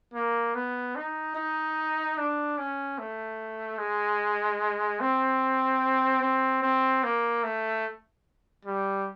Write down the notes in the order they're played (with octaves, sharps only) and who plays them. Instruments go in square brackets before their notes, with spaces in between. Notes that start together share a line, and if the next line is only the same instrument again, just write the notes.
[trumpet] A#3
B3
D#4
D#4
D4
C#4
A3
G#3
C4
C4
C4
A#3
A3
G3